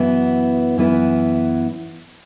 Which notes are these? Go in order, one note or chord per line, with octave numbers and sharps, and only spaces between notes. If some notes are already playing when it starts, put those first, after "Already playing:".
Already playing: F#2 E3 B3 E4
F#2 E3 B3 E4